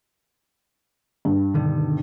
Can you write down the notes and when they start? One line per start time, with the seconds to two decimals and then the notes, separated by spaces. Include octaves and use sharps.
1.25 G2
1.54 B2 D3 D#3